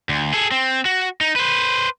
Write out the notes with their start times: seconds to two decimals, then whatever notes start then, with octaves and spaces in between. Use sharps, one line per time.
0.09 D2
0.34 G#4 A4
0.51 C4
0.85 F#4
1.21 D#4
1.36 B4 C5